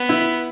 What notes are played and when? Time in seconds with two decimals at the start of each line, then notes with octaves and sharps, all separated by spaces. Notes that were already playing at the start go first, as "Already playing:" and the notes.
Already playing: B3
0.09 E4